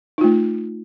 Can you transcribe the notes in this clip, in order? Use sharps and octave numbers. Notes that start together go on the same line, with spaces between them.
A3 D#4 F4